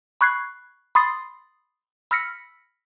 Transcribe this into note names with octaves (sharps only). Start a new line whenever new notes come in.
B5 C#6 F#6 G#6 C7
B5 C6 D#6 A6 C7
B5 E6 F6 A#6 B6 C#7